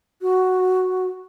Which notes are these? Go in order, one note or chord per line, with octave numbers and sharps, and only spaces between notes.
F#4